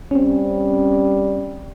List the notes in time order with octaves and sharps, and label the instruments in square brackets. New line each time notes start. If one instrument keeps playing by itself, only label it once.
[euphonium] G3 [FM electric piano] C4 C#4